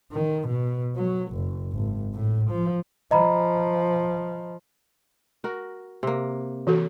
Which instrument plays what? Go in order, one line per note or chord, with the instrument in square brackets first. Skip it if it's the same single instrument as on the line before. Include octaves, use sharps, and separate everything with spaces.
[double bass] D#3
B2
F#3
F#1
G#1
A2
F3
[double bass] F3 [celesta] D#5 A#5 B5
[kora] F#4 A#4
C3 A#3
[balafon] E3 F#4 A4